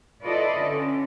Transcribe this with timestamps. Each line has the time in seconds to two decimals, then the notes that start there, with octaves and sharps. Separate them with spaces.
0.23 E4 F4 A4 B4 D5 D#5
0.58 D3 C#4